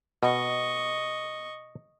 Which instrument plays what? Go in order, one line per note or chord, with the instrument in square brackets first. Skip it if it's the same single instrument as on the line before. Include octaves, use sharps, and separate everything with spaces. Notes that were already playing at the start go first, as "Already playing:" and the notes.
[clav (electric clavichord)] B2 [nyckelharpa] D#5 C#6